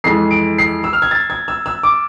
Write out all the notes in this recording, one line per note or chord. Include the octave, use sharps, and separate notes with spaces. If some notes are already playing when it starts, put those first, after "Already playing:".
F2 E3 G#3 C7
D7
C7
E6
F6
G#6
A6
G#6
E6
E6
D6